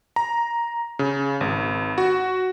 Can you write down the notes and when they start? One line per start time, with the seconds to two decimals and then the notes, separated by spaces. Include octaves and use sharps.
0.16 A#5
0.99 C#3
1.41 G#1
1.98 F#4